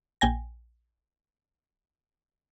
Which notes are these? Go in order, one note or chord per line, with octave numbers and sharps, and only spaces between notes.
A#1 G5 G#5 A#6